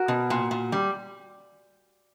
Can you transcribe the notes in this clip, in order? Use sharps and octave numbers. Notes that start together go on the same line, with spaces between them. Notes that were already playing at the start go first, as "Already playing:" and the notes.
Already playing: F#4 A#4
B2
A#2
A#2
G3